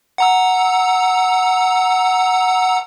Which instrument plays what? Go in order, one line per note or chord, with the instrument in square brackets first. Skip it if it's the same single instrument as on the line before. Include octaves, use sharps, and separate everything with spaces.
[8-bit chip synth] F#5 A#5 E6